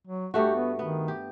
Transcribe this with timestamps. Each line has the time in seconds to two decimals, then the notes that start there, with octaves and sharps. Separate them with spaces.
0.07 F#3
0.34 G2 A3 F#4 G4
0.55 B3
0.79 D#3 B3
1.08 G4